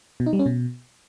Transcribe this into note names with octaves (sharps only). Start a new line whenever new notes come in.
B2
D#4
G3
C#4
B2